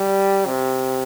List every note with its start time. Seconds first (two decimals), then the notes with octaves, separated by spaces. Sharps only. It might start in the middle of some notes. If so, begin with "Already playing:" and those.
Already playing: G3
0.46 C3